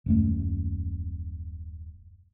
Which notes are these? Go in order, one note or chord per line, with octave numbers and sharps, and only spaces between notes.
D#1 F#2 A3